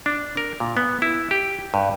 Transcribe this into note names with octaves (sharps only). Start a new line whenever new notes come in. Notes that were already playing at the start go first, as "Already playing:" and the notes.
D4
A#4
A#2
B3
E4
G4
G2